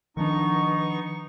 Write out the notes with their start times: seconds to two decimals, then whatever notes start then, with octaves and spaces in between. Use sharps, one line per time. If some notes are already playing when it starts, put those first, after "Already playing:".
0.17 D#3 F3 B3 D4 D#4 C#6